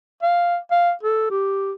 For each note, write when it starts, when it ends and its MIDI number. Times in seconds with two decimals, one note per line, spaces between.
0.22 0.57 77
0.71 0.92 77
1.03 1.28 69
1.31 1.72 67